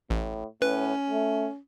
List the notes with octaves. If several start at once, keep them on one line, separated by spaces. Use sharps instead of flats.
A1 A2
A2 C#4 B4
A3